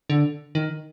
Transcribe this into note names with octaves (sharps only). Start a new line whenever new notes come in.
D3
D#3